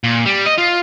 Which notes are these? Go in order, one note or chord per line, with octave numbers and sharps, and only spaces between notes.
A#2
G3
D#5
F4